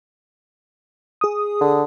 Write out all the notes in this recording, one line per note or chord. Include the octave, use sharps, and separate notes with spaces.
G#4 D#6
D3